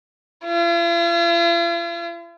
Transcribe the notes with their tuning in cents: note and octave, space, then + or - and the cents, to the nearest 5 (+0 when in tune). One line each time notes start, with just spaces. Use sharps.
F4 -45